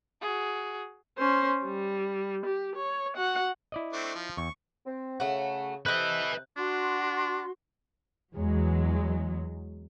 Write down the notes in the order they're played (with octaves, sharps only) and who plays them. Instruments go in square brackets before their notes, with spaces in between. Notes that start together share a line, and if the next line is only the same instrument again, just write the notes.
[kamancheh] F#4 G#4
[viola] C#4 C5
G3
G4
C#5
F#4 F#5
[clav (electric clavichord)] E4 D5 D#5
[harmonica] A3 C4 D4
F3
[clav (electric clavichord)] E2 [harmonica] C#6
[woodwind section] C4
[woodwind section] C#3 [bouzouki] A3 F#4
[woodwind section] C3 [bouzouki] A4 D#5 [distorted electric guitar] B4 E5 [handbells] F#6 G6
[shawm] D4 [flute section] F#4 C6
[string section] E2 F#3 G#3